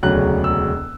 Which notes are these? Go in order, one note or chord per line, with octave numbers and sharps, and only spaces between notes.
E1 D2 C#3 F#3 F#6
E6